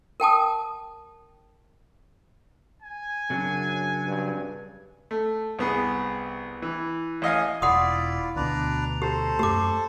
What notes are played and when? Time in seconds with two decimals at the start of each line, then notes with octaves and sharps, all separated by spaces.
0.20 A#4 G5 A5 D#6
2.83 G#5
3.30 F#2 C#3 F#3 D4
4.06 G2
5.11 A3
5.59 C2 B3 G#4
6.62 E3
7.22 A1 D#5 F5 G#5
7.62 E1 E4 F4 D5 F#5 C6 D#6
8.36 D2 B2 D4 B4 D5 A#5
9.02 G4 A4 C5
9.39 F#2 A3 G4 D6